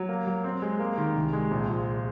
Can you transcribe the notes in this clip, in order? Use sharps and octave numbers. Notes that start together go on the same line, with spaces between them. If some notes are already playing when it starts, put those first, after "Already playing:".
Already playing: F#3
A#3
F#3
C4
G#3
A#3
D#3
C2
G#3
A#1
F3